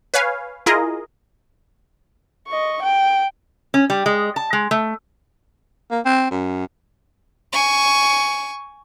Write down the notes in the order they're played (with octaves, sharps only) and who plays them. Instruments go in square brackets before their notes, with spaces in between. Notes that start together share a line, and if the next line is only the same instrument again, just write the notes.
[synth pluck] B4 C#5 F5 G#5
E4 F4 G#4 A#4 D#5
[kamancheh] D#5 C#6
G5
[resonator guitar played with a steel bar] C#4
G3
G#3
A5
G#3
A3
[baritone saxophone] A#3
C4
F#2
[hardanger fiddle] G#5 C#6